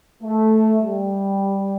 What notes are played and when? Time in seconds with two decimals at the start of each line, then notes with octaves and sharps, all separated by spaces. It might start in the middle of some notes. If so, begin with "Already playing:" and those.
0.23 A3
0.81 G3